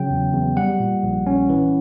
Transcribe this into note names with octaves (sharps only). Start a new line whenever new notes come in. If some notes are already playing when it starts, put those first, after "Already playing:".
Already playing: C#3 F#3 G5
E2
E2
G3 F#5
A#2
A#1
C#4
E3